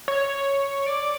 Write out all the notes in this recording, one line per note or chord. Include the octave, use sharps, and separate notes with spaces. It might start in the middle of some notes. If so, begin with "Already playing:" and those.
C#5
D5